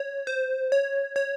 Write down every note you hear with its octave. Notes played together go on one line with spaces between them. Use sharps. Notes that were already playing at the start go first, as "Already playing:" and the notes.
Already playing: C#5
C5
C#5
C#5